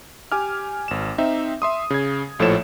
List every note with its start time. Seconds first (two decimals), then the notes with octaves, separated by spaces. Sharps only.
0.32 G4 G#5 D6 F6
0.88 G#1 E7
1.18 C4 D#4 E5
1.62 E5 C6 D#6
1.90 C#3 G#6
2.39 A#1 A2 F3 A4 C#5 E7